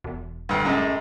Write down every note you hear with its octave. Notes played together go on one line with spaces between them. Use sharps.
E1
D2 G2
F#2 A2 G#3